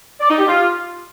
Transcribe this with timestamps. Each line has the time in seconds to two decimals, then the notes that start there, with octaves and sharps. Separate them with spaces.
0.21 D5
0.30 D#4
0.38 G4
0.47 F4